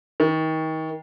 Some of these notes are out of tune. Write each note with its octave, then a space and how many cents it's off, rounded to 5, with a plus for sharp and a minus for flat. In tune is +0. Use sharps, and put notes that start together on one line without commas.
D#3 +30